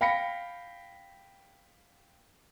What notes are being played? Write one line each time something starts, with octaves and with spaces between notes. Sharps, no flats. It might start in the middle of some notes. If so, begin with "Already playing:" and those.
F5 G5 B5 A#6 B6 C#7